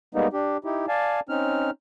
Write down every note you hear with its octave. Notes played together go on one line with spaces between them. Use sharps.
G3 G#3 A#3 B3 D#4
D4 G4
D#4 E4 G4
D5 F5 G#5 A5
C4 C#4 D#4 F6